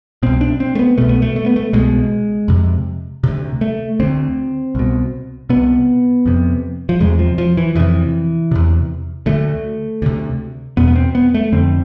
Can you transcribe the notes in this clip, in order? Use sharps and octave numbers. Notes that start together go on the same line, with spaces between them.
C2 B2 C4
D4
C4
A3
B3
C2 B2 A3
B3
A3
A3
B3
A3
C2 B2 G#3
F2 C3
D2 C3
A3
D2 D3 C4
C2 B2
C2 C3 B3
F2 C3
F3
E2 C3 G#3
F3
F3
E3
F2 C3 E3
E2 C3
D2 D3 A3
D2 C3
E2 B2 B3
B3
C4
B3
A3
F2 D3 C4